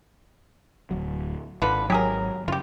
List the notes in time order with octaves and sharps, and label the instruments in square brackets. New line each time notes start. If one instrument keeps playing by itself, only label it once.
[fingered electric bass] D1 F#3
[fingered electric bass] G#1 [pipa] D3 F4 B4
[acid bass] F#3 [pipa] G4 G#4 A#4
[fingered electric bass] F#2 C#3 [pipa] F4 G4